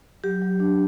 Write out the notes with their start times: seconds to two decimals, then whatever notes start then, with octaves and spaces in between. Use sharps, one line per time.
0.24 F#3 G4
0.42 F#3
0.60 D4